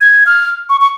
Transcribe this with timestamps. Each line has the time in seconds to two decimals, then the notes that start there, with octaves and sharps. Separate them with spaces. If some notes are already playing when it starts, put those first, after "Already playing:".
0.01 G#6
0.26 F6
0.69 C#6
0.81 C#6